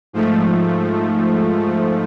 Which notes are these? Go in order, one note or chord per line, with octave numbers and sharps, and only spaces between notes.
G#2 F3 A3